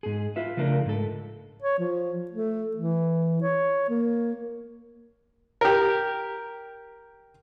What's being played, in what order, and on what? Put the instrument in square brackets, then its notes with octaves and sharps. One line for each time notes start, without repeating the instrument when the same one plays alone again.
[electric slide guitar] G#2 G#4
F4 B4 E5
C#3 F3 A3 D4 A#4
G#2 A4
[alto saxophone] C#5
F3
A3
E3
C#5
A#3
[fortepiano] G4 A#4